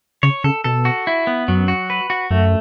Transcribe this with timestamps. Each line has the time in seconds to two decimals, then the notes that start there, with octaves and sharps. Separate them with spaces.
0.23 C#3 C#5
0.44 C#3 A4
0.64 B2 A4
0.85 F#4
1.07 E4
1.27 B3
1.48 F#2 F#3
1.68 F#4
1.90 B4
2.10 F#4
2.30 F#2 A3